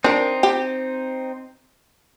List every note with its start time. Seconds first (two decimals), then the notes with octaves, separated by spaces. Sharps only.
0.04 C4 D4 D#4 A#4
0.43 G4